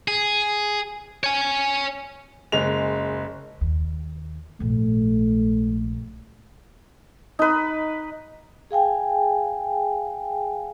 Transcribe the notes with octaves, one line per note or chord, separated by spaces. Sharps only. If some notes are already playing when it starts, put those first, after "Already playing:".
G#4
C#5 G#5
F#1 G#3 F7
D#2
A#1 G#2 A3
D#4 B4
G#4 F5 G5 G#5